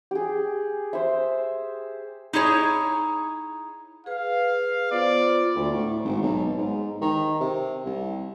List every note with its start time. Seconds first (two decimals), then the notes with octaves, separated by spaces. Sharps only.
0.11 G4 G#4
0.93 C5 E5
2.33 D#4 E4 G#4 C#5
4.06 G#4 B4 F5
4.91 B3 F4 C5 D5
5.55 D2
5.73 A2
6.04 G#1
6.22 B1
6.58 G#2
7.01 D#3
7.40 C3
7.85 C2